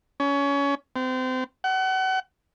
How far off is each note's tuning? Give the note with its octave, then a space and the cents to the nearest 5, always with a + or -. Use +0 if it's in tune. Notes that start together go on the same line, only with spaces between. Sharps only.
C#4 +25
C4 -30
F#5 +35